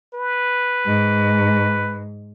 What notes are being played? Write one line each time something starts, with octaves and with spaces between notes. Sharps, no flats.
B4
G#2